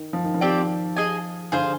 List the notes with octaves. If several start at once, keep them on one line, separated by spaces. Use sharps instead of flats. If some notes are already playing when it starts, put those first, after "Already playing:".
Already playing: D#3
F3
D#3
F3
C4 G4 D5 G5
G#4 D#5 G#5
D3 G#4 C5 F5